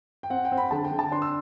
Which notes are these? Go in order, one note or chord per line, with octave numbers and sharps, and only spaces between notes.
G5
C4 F#5
G5
C4
B5
D3 A5
G5
D3
A5
D4 C6
E6